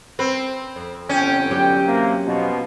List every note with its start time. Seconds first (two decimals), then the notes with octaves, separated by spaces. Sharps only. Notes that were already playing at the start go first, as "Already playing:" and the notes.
0.19 C4 B4
0.76 F2
1.09 G1 C#4 G5
1.51 E2 F#3 G4
1.85 C3 A#3
2.24 B2 F3